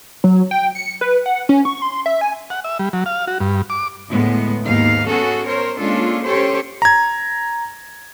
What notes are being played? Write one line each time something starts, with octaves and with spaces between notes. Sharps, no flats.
F#3
G5
C#7
B4
F#5
C#4
C#6
C6
E5
G#5
F#5
E5
G3
F#3
F5
F#4
G2
D6
D2 A2 G#3 B3
D#2 G#2 B3 D#4 F5
B3 C#4 F#4 G#4 A4
A#4 C5 C#5
G#3 A#3 C#4 D4 F4 A4
C#4 G4 A4 C5 C#5
A#5 G#6